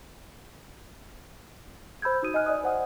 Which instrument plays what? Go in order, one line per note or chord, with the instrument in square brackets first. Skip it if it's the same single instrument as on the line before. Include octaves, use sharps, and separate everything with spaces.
[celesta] C5 B5 E6 G6 G#6
D#4 F#4 D#6 D#7
D#5 G#5 F6 F#6
D5 D#5 G#5 D#6
C5 F#5 D#6